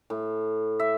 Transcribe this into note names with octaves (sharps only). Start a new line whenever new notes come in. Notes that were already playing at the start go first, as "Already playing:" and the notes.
A2
E5